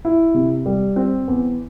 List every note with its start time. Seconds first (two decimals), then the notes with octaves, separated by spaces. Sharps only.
0.05 E4
0.34 C3
0.66 G3
0.96 C4
1.28 E2